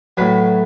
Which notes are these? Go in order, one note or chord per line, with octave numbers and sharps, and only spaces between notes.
A2 F#3 B4